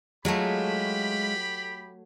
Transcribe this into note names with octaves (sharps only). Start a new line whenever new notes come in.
F#3 G#3 A3 F4 G4 B5